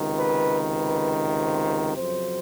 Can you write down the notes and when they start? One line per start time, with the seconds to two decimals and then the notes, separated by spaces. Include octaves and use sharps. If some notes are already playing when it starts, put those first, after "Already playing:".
Already playing: C#2 C3 D#3
0.18 B4
0.77 B4
1.37 C5
1.97 F2 C#3 F#3 C5